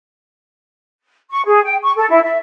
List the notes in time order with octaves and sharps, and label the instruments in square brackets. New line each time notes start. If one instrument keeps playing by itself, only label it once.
[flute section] C#6
G#4
G5
C#6
A4
E4
E5